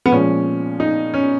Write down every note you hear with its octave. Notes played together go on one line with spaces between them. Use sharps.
B3
A#2 F3 G#3 C#4
D#4
C#4